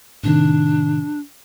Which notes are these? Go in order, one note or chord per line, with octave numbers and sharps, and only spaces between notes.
A2 C3 D#3 D4